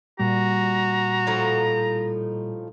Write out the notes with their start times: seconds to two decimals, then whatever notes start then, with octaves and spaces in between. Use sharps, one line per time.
0.19 A#2 G3 F#4 A#5
1.27 A2 F3 D#4